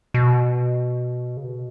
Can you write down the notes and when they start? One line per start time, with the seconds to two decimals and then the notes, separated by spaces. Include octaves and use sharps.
0.14 B2
1.37 C#3
1.44 B2